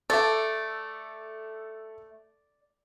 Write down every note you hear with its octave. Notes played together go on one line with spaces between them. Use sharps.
A3 A4 D5 E5